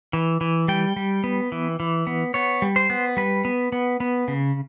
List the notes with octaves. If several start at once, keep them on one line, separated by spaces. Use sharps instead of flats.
E3
E3
G3 G5
G3
B3
E3
E3
B3
B3 C#5
G3
C5
B3
G3 B4
B3
B3
B3
C#3